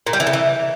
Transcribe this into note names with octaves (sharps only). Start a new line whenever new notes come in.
A#2
G3
E3
C#3
E3